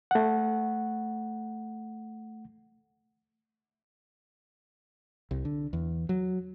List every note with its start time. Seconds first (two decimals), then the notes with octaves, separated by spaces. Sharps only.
0.11 A3 F#5
5.31 C2
5.45 D3
5.73 E2
6.09 F#3